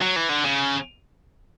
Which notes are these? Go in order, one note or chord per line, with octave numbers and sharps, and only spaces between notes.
F#3
E3
D3
C#3